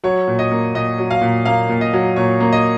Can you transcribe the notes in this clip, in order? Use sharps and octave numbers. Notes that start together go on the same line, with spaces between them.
F#3 C#5
A#2
D#5
A#3
A#2 D#5
F#3
F5
A#2
A#3 F5
A#2
D#5
F#3
A#2 C#5
A#3
D#5